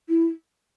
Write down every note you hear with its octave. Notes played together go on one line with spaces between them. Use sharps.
E4